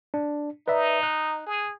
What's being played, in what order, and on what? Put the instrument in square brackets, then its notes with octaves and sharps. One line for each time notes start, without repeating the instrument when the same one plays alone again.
[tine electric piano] D4
[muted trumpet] D#4 [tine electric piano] B4 D5 E5
[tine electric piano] F#6
[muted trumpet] G#4